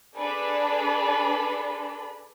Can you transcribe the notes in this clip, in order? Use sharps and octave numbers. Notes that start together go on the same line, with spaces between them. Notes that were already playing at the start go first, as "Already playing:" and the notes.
D4 G#4 A4 B4 D5 B5